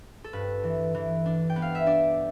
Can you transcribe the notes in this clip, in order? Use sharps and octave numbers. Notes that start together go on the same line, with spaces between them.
A4
G2 B4
E3
E3
D4
G5
B3
F5
E5
D4 D5